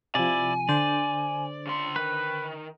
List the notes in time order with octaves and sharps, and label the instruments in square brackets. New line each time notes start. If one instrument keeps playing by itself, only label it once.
[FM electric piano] C3 F3 [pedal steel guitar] E4 D5 [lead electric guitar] G#5
[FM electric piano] D3 C5 [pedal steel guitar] D5
[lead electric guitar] C#3 C6
[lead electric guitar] D#3 [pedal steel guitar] B4